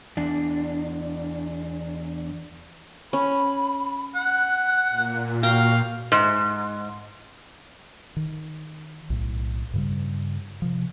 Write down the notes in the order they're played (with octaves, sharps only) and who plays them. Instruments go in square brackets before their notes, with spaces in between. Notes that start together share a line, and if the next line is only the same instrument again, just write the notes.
[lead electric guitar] E2 D4
[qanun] C#4 [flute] B5
[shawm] F#5 [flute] F#6
[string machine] A#2
[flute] F#4 [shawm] F5 [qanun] G5 A#5
[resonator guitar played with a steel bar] G#2
[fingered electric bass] D#3
B1 A2
G2 C#3 G3
C3 F3